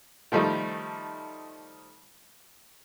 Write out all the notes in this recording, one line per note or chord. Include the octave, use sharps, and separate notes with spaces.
D#3 F3 G3 A3 D#4